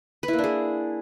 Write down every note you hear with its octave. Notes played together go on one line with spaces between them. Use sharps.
B4
E4
A#3
D4
G#4